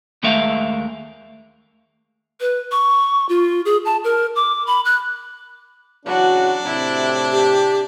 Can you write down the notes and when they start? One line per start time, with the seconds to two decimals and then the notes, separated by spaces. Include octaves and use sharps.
0.23 D#2 G#3 A3 A#4 E5 F5
2.40 B4
2.72 C#6
3.29 F4
3.65 G#4
3.85 A5
4.04 A#4
4.36 D6
4.67 B5
4.85 F#6
6.06 C#3 E3 F#3 D4 F#4
6.65 A2 C3 E4
7.32 G4